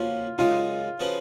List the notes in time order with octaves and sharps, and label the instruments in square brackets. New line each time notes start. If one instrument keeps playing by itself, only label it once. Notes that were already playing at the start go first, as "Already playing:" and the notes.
Already playing: [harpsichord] F3 A#3 C#4 F#4 [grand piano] F4
[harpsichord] F#2 C#3 G#3 D#4 [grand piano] F4
[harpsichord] C#3 F3 B3 F#4